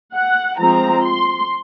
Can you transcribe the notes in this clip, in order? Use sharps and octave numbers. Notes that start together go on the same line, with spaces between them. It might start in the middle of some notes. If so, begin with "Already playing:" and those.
F#5
F3 G#3 C4 A#5
C6